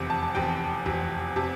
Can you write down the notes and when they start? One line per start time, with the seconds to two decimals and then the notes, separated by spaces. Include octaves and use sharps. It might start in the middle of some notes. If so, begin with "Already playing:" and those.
Already playing: F1 E2 C3
0.10 A5
0.23 A5
0.35 F1 E2 C3 G5
0.86 F1 E2 C3
1.36 C3 A5